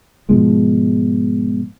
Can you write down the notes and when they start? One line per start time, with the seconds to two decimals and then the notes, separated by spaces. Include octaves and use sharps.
0.29 G#2 B2 F3 G#3